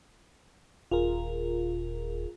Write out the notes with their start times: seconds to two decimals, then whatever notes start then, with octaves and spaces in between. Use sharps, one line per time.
0.91 D#1 F4 G#4 A#4